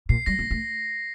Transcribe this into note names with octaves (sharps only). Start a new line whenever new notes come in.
A#2 C7
G3 A#6
A#3
A3